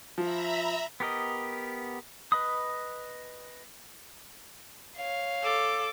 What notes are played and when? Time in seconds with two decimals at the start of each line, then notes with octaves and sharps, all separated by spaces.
0.18 F3 E5 A#5 B5
1.00 B3 G4 A#4 D#5
2.32 B4 D#5 B5 D#6
4.96 C#5 F5
5.42 A4 D6